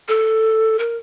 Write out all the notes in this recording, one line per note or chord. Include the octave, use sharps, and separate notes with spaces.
A4
A#4